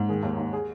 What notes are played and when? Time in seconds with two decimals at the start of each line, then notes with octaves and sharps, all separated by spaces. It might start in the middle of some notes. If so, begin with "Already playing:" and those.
Already playing: G#2
0.09 D#3 G#4
0.23 D#2
0.38 D#2
0.53 G#4